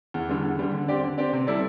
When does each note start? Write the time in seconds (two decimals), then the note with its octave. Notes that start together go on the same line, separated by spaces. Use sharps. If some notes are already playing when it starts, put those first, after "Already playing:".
0.14 E2
0.29 D3 G3
0.44 E2
0.59 D3 G3
0.73 D3
0.88 C4 G4 D5
1.03 D3
1.18 C4 G4 D5
1.33 C3
1.47 G3 E4 A4 D5